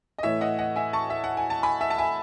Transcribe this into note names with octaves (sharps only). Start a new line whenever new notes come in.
D#5
A2 E3 A3 C#5 E5
D#5 F#5
D#5 F#5
E5 G#5
A5 C#6
E5
F#5
G#5
A5
G#5 B5
E5 G#5
A5
E5 G#5